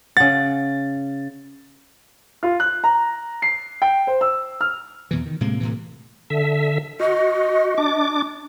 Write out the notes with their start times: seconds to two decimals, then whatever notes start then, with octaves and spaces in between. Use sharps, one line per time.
0.17 C#3 F#5 A6
2.43 F4
2.60 F#6
2.84 A#5
3.42 C7
3.82 G5
4.07 C5
4.21 E6
4.61 F6
5.11 E2 B2 E3
5.26 D#3
5.40 A2 C3 G#3 A#3
5.60 A2 C3 E3
6.30 D3 E5
7.00 F#4 D#5
7.78 D4 D6